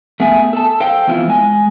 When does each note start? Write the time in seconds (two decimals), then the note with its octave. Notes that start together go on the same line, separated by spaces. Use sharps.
0.20 A3 B3 G#4 E5 G#5
0.53 A4 A5
0.80 A4 C5 F5 G5
1.07 E3 B3 C4 E4 F4
1.28 G#3 G#5